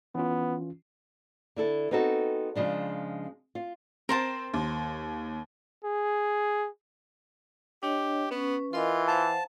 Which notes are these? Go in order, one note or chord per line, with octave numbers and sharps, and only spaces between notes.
E3 B3 C#4 F4
D3 E4 A4
B3 C4 D#4 F#4 A4
C#3 F3 G#3 D4
F4
C4 A#4 C5 A5
D#2
G#4
D4 G4 C#5 D#5
B3 C#4 B4 C#6
E3 F4 A#4 D#5
C5 F5 F#5 A5